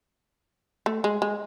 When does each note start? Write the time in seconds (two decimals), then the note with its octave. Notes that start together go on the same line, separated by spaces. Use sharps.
0.86 A3
1.04 G#3
1.22 G#3